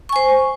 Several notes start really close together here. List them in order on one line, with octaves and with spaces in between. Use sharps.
C#6 G#5 C5